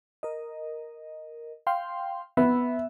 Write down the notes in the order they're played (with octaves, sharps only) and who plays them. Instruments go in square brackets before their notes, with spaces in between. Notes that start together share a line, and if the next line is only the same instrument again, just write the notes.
[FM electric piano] A#4 D#5
F5 G5 C6
[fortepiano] B3 [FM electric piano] E5